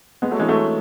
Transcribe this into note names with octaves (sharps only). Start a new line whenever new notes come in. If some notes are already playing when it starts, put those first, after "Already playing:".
G#3 B3
F#3 A3
E3 G#3
F#3 A3